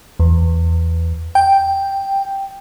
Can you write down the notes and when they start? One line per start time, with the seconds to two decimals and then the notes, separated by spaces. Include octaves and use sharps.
0.19 E2
1.35 G5